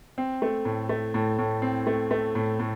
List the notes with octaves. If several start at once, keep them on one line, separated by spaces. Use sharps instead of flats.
C4
A3
A2
A3
A2
A2
C4
A3
A3
A2
A2